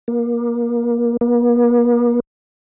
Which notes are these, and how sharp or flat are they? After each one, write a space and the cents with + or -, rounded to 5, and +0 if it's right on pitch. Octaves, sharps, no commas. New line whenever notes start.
A#3 +25
A#3 +45